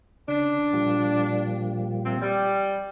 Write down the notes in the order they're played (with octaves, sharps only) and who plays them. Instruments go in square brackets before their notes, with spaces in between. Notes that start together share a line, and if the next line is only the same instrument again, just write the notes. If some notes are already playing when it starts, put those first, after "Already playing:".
[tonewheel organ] C#3 [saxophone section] D4
[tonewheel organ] A#2 F3 G3
[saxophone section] C3 C4
G3